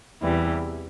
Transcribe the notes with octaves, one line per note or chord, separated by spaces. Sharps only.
E2 C3 E3 G3